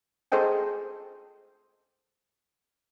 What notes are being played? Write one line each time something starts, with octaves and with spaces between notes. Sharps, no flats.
G#4 A4 C5 D#5 G5 G#5